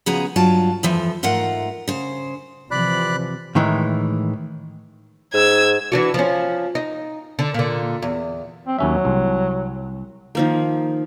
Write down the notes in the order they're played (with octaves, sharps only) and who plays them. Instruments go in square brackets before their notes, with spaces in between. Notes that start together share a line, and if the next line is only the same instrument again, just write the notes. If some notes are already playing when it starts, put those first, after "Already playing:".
[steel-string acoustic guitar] C#3 F3 B3 F#4 G#4 A#5
G2 F#3 F4 A5
F2 E3 F3
G#2 A3 F4 A#4 F#5
C#3 C5
[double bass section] C3 E3 F3 [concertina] D5 B5 F#6
[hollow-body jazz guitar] A2 D#3 E3 G#3
[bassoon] G#2 [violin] E6 G#6
[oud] E3 D4 F#4
F3 C#4
D#4
D3
A#2 D3
E2
[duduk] C4
[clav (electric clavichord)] D#2 C#4 E5 [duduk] F#3
[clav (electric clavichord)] C2
[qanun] D#3 F3 A#3